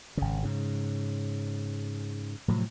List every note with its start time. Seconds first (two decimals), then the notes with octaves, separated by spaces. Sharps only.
0.17 G#1 C#3
0.43 G#2 C#3
2.48 A2 C3 F3 F#3